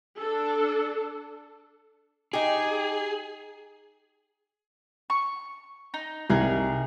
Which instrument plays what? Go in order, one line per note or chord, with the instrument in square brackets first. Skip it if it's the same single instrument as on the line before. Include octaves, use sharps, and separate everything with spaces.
[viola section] D4 A4
[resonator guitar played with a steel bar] D#4 G4 [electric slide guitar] G#4
[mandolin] C#6
D#4
[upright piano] C2 [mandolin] D#4 G#4 A#4